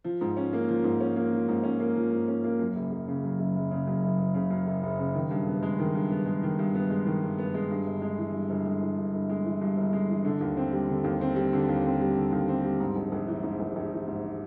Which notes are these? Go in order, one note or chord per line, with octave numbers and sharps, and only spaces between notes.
F3
G#2
C#4
A#3
F3
G#2
C#4
A#3
F3
G#2
C#4
A#3
F3
G#2
C#4
A#3
F#2
F#1
F#1
C#3
F#2
F#1
F#1
C#3
F#2
F#1
F#1
C#3
F#2
F#1
F#1
C#3
D#3
G2
B3
G#3
D#3
G2
B3
G#3
D#3
G2
B3
G#3
D#3
G2
B3
G#3
G2
G1
G#3
E3
G2
G1
G#3
E3
G2
G1
G#3
E3
G2
G1
G#3
E3
D3
D#2
C4
G3
D3
D#2
C4
G3
D3
D#2
C4
G3
D3
D#2
C4
G3
G#2
A#1
A#1
E3
G#2
A#1
A#1
E3
G#2